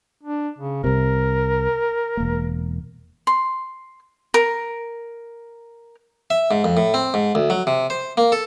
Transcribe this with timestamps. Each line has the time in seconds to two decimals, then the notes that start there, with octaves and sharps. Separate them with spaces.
0.23 D4
0.58 C#3
0.84 C2 C3 A#4
2.17 E1 A#3
3.27 C6
4.34 A#4
6.30 E5
6.51 G#2
6.64 F2
6.77 A2
6.94 C4
7.14 G#2
7.35 D2
7.50 F#3
7.67 C3
7.90 C5
8.17 A#3
8.32 A4